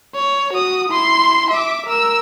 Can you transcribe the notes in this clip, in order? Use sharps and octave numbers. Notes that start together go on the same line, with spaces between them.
C#5
F#4 D#6
E4 C6
E5 D6
A#4 E6